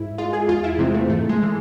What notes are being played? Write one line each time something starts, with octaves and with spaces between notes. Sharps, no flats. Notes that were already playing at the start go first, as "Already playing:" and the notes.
Already playing: G#2 E4
G#3 F4
G#4
E2 F4
E4
C3 E3 G#3 C4
A3
G#2 A3
G#3
G#3
E3